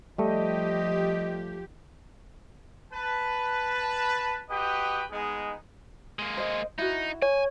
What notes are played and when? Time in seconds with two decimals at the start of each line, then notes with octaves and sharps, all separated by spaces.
0.18 F3 G3 A3 G4 D#5
2.93 B4 A5
4.49 F#4 G4 B4 D#5 G5
5.10 G#3 B3 D#4 G#4
6.19 G#3 A#3
6.37 C5 D#5
6.79 D#4 E4 F#4
7.22 C#5 G#5